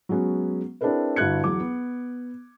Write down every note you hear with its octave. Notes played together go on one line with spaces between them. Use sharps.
F#3 G#3 B3 C#4 F#4
C4 D4 E4 G#4 A#4 B4
G1 E4 F#4 F#6 G#6 C#7
E2 F#3 D6
B3